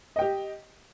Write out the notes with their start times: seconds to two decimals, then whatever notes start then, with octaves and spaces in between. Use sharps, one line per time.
0.16 D#5
0.19 G5
0.21 G4